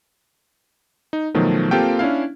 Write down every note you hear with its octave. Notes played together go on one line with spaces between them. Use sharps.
D#4
B2 D#3 F3 F#3 A3
A#3 C4 F4 G4 A4 G5
C#4 D4 E4 F5